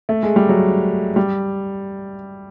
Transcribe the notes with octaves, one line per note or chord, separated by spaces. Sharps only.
A3
G#3
G3
F#3
G3